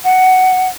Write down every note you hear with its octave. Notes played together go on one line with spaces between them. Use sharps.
F#5